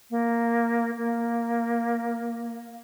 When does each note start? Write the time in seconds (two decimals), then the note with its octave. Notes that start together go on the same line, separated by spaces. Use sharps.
0.11 A#3
0.98 A#3